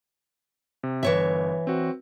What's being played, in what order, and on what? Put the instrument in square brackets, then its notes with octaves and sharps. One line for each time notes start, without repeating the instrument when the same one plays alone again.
[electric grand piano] C3
[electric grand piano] G1 [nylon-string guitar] E3 C#5 E5
[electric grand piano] C4 F#4